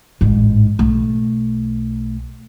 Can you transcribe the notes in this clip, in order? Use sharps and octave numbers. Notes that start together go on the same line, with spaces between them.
A1 G#2
B1 A3